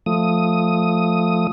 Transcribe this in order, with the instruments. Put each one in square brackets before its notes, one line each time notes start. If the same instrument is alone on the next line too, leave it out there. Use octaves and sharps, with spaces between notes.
[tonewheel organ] F3 A3 D#6